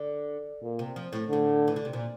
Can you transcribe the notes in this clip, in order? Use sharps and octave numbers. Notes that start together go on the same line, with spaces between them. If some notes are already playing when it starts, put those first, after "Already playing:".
Already playing: D3
A#2
C3
F3
A2
A2 D3
E3
D3
C3
A#2